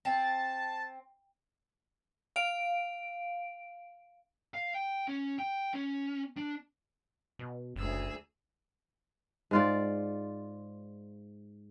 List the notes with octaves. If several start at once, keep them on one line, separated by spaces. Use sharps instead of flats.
C4 A5
F5 D7
F5
G5
C#4
G5
C#4
D4
B2
F#1 D2 G#4 E6
G#2 F4 D5